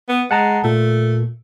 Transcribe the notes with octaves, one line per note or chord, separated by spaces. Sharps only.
B3
G#3 F#5 A5 A#5
A#2 A3